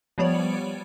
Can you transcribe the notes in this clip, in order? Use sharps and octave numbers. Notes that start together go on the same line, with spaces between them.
F3 G3 B3 C#5 D5